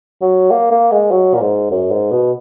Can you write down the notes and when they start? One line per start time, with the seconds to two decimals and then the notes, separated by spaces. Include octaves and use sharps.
0.22 F#3
0.51 A#3
0.72 A#3
0.92 G#3
1.11 F#3
1.35 A#2
1.41 G#2
1.71 F#2
1.91 G#2
2.11 B2